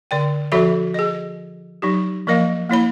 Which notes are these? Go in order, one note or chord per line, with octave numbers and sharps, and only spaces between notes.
D3 D5 G5
F3 F#4 A4 C#5 E5 B5
G#4 D#5
F#3 D#4 G4
F3 A#3 A#4 D#5 F5
A#3 E4 C#5 B5